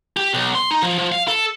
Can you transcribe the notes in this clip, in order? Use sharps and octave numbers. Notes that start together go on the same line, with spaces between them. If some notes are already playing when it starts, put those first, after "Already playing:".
G4
B1
C6
D#4
F3
F3
F5
A4